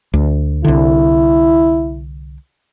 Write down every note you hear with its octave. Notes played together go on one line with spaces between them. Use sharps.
D2
C2 D3 E4